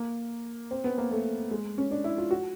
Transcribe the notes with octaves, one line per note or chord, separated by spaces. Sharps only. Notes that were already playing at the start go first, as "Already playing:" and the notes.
Already playing: A#3
C4
B3
A#3
A3
G#3
C#4
D4
E4
F4
F#4